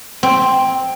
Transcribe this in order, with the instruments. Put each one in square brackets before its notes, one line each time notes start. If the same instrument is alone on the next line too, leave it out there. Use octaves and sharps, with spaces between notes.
[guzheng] C4